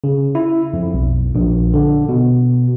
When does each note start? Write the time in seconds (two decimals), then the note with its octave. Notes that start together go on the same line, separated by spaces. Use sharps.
0.04 C#3
0.35 E4
0.73 F2
0.94 B1
1.35 A#1
1.74 D3
2.09 B2